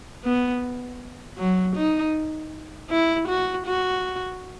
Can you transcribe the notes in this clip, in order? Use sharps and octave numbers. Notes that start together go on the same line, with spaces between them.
B3
F#3
D#4
E4
F#4
F#4